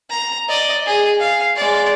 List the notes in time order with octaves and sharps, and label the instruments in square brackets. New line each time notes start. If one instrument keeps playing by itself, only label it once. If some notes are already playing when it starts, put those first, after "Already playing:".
[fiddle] A#5
D5 D#5
G#4
F5
G#3 D5